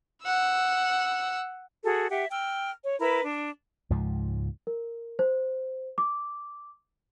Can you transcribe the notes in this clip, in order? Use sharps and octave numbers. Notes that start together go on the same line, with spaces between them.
F#5 E6
F#4 G#4 A4
G4 E5 F#5
G5 E6 F6
C#5
E4 A#4 B4 B5
D4
C#2 G#2 F3
A#4
C5
D6